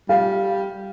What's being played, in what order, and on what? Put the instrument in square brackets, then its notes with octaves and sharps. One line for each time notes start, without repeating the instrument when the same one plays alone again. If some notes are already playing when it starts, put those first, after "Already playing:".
[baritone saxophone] G3 [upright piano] F5